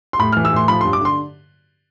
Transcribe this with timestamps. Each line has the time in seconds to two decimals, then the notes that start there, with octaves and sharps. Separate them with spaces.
0.13 C6
0.19 A2 B5
0.33 E3 F6
0.45 E6
0.53 A2 C6
0.68 F3 B5
0.81 G2 C6
0.93 D6
1.01 D3 C6